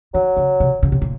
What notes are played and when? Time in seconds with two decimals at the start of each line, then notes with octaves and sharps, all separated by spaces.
0.14 D#3 F#3
0.37 C#3
0.60 C3
0.83 C#3
0.92 C3
1.02 A#2